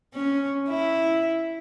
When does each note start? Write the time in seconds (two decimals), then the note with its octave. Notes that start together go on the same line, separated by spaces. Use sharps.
0.14 C#4
0.69 E4